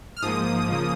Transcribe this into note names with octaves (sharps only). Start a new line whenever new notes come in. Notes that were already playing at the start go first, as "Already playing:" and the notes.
F6
G#2 F3 A#3 D#6
C#3 F3 A#3